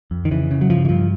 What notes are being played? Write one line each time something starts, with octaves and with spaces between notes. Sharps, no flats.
F2
D#3
C#3 E3
C#3
F#3
G2 F3
E3
G2 F3